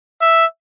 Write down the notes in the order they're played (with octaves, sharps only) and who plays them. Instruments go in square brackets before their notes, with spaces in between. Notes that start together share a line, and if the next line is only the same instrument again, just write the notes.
[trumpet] E5